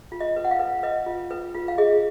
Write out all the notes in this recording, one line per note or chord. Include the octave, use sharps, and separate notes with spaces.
F4
D#5
B4
F#5
F5
B4
B4 D#5
F4
B4
F4
F5
G#4 D#5